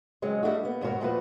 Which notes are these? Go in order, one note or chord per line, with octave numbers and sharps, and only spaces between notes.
C#3 F#3 G#3 C4
G3 A3 D4 F#4
A#3 B3
D#2 G#2 B2 F#4 A#4
E2 A#2 F3 A3 F#4 B4